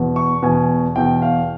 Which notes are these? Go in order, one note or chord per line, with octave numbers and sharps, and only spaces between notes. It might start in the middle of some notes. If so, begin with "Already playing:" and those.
Already playing: E2 B2
C#6
E2 B2 G#5
E2 B2 G5
F5